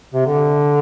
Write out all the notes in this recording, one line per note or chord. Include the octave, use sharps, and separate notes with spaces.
C3
D3